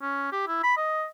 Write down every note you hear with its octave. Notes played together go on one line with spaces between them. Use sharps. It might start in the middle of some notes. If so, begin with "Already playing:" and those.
C#4
G4
E4
B5
D#5